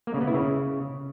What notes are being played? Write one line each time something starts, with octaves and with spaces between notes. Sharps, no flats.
A#3
C#3
B3
E4
C#3